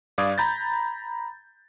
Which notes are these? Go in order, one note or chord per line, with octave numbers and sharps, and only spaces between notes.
G2 D5 F5 D6 D#6 G#6
A#5 B5 G6 A6